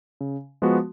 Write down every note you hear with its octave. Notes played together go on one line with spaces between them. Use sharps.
C#3
F3 G#3 B3 F#4